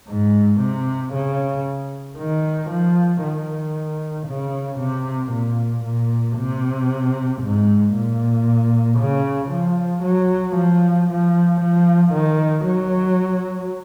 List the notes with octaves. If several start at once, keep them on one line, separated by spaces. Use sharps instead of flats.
G#2
C3
C#3
D#3
F3
D#3
C#3
C3
A#2
A#2
C3
G#2
A#2
C#3
F3
F#3
F3
F3
F3
D#3
F#3